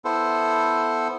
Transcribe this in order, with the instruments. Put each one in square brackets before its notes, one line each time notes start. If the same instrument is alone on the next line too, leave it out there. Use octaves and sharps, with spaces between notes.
[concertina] B3 E4 A4 C5